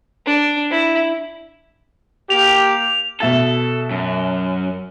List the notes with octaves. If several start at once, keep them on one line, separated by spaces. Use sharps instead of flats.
D4
E4
A#3 G4 F7
B2 A4 E5 A6
F#2